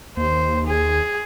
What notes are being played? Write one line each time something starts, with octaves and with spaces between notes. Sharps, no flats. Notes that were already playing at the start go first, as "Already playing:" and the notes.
D#2 C5
G#4